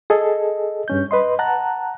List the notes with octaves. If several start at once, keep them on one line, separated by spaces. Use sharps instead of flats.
G#4 A4 D#5
G2 C#4 G6
B4 D#5 C6
F#5 A5 A#5 F#6